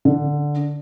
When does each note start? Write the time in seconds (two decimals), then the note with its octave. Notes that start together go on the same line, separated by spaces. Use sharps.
0.05 D3